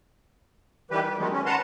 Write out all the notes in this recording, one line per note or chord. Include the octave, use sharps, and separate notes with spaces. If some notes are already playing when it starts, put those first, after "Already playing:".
D#3 E3 G3 G4 B4
G3
D#3 F#3 G#3 A3 B3
C#4
B4 F#5 A5 A#5 C6